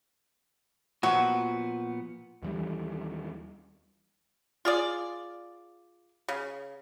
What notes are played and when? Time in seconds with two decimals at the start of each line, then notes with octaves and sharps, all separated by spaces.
1.03 A#2 F3 F#3 B3 F#4
2.43 D#2 E3 G3
4.65 F4 G#4 D5
6.28 C#3